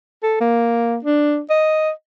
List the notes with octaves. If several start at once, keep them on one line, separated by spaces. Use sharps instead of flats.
A4
A#3
D4
D#5